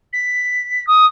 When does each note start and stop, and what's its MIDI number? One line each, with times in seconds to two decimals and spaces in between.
0.13 0.86 95
0.87 1.06 87